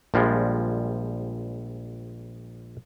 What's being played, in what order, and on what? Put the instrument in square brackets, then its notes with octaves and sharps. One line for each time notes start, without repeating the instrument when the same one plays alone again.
[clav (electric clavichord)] A#1 F3 G3 G#3